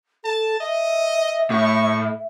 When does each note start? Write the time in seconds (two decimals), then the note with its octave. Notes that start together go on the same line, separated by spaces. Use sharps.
0.24 A4 A5
0.60 D#5 E5
1.50 A2 C#6